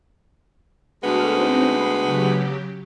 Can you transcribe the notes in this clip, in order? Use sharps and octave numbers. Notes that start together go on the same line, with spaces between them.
D2 G#3 B3 F#4 A4 F6
C4 D#4 C5
B5 C7
C#3 F#3 G4